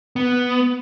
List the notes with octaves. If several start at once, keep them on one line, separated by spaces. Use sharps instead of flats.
B3